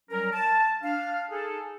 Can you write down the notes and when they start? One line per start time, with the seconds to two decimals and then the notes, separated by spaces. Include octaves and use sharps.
0.10 F#3 G3 C#4 A#4
0.33 A5
0.83 D4 F5
1.30 D#4 G#4 A4